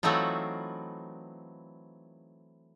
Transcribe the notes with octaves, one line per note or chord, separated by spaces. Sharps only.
E3 F#3 A3 C4 D#4 F4